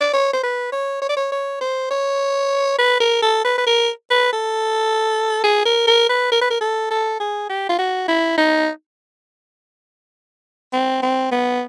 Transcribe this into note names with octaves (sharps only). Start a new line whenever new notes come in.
D5
C#5
C5
B4
C#5
C#5
D5
C#5
C#5
C5
C#5
B4
A#4
A4
B4
B4
A#4
B4
A4
G#4
A#4
A#4
B4
A#4
B4
A#4
A4
A4
G#4
G4
F4
F#4
E4
D#4
C4
C4
B3